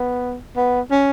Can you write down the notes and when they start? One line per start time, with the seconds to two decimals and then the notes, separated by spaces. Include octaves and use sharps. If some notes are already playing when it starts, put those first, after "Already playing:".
Already playing: B3
0.57 B3
0.91 C#4